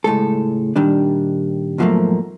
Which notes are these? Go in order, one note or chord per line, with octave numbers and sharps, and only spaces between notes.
C#2 A2 G#3 A4
A#2 D#3 G3 D4
G#2 B2 F3 F#3 A3 A#3